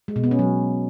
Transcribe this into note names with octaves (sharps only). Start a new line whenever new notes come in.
G#3
B2
B3
C#4
F#3